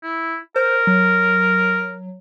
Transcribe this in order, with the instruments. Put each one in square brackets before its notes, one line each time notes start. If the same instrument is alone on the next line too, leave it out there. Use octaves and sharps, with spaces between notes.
[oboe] E4
[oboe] A#4 [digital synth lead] C5
[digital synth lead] F#3